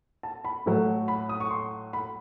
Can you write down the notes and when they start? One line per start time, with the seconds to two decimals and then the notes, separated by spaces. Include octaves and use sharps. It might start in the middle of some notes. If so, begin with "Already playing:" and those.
0.23 A5
0.45 B5
0.66 A2 F#3 A3
1.08 B5
1.29 D#6
1.40 C#6
1.51 C6
1.93 B5